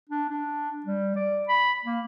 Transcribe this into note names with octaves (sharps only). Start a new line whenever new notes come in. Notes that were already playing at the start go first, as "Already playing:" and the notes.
D4
D4
G3
D5
B5
A#3